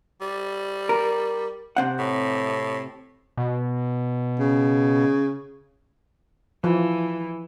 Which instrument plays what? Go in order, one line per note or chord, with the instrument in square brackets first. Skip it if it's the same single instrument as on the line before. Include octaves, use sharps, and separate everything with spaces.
[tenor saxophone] G3
[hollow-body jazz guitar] A#4
C3 C4 F#5
[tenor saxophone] A2
[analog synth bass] B2
[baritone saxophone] C#3
[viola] E3 [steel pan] F3